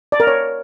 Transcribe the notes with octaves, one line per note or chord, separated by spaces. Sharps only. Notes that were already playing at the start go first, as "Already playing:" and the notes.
D5
A#4
C#5